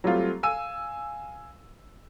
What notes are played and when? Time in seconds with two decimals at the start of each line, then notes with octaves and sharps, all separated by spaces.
0.04 F#3 G3 A3 C4 F4
0.43 F5 G#5 E6 D#7